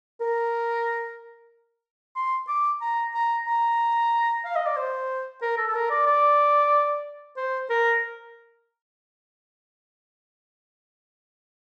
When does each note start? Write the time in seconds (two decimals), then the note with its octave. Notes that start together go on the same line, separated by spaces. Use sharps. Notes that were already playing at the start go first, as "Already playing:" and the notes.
0.21 A#4
2.16 C6
2.48 D6
2.81 A#5
3.14 A#5
3.47 A#5
4.45 F5
4.56 D#5
4.66 D5
4.77 C5
5.42 A#4
5.57 A4
5.67 A4
5.75 A#4
5.91 D5
6.06 D5
7.37 C5
7.70 A#4